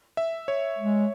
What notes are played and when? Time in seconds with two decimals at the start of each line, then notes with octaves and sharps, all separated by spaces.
0.17 E5
0.48 C#5
0.79 G#3